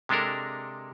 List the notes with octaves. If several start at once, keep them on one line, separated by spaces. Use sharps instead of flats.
C3 G#3 D4 A4 A#4